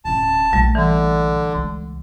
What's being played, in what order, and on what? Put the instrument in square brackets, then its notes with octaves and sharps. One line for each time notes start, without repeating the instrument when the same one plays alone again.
[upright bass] D1 C#4 [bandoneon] A5
[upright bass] A#1 [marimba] G3 A3
[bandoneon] D3 [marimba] E3
[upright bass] C#2